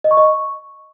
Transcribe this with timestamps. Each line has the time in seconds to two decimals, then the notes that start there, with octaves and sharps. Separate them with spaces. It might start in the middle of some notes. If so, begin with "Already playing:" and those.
0.04 D#5
0.11 C#6
0.17 D#5
0.24 C#6